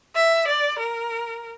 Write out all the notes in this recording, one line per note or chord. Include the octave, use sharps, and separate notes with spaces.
E5
D5
A#4